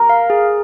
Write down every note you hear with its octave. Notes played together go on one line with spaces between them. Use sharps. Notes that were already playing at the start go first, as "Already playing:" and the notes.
Already playing: A#4
F5
G#4